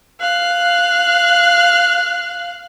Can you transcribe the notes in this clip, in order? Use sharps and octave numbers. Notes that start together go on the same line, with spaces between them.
F5 F#6